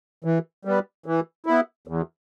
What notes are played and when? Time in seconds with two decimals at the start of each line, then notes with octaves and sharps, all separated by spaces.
0.24 E3
0.65 G3 B3
1.06 E3
1.46 B3 E4
1.87 E2